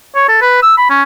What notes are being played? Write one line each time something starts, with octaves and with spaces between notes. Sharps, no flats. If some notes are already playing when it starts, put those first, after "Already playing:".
C#5
A4
B4
E6
B5
C#4